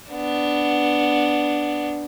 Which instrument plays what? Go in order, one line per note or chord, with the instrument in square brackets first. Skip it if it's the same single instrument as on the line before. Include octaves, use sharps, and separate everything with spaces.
[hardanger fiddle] B3 D4